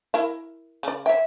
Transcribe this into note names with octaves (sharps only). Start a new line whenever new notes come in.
E4 A#4 E5
C#3 D5
C#5 E5 G5